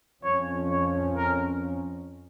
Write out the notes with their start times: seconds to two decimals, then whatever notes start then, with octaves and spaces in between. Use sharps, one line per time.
0.23 F2 F3 C#4 C#5
0.71 C#5
1.17 A#4